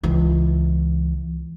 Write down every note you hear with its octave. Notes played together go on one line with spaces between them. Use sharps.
C#2 E3